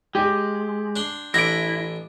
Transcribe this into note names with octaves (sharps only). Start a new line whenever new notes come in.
G#3 G4
D4 C6
A1 D4 E4 E5 A#6 D7